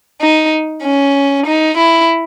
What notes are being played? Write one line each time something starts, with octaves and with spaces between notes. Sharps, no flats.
D#4
C#4
D#4
E4